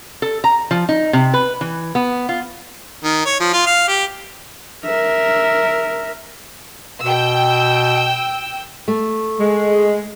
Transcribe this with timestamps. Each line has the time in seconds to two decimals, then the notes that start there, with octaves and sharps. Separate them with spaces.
0.22 A4
0.44 A#5
0.71 F3
0.89 D#4
1.13 C3
1.34 B4
1.61 E3
1.95 B3
2.29 F4
3.04 D#3
3.26 C#5
3.40 F3
3.53 F4
3.66 F5
3.88 G4
4.86 A#4 E5
7.02 B2 G5 E6
8.88 A3
9.39 G#3